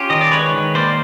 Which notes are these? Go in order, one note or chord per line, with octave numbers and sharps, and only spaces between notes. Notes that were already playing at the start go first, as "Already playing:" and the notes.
Already playing: C#4 F4 G4
D#3 D#5
D5
G#3 B4 C#5
D#3
A#3 C5 D5